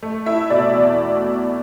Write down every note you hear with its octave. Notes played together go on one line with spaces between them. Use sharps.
A3
E4 E5
B2 D5
E2